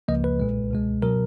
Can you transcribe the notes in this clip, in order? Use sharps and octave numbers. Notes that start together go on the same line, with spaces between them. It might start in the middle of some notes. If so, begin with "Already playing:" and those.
C#2 C#3 F3 A#3 D#5
B4
B1 A#2 G#3
C#2 B2 G#3
B2 F#3 A#4